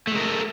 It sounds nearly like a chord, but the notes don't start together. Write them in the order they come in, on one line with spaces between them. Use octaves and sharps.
A3 G#3 A#4 A4